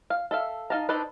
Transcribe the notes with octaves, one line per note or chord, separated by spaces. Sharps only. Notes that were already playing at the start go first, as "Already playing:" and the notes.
F5
A4 E5 F5
D#4 D#5 F5 A5 A#5
D4 D#4 A4 B4 C5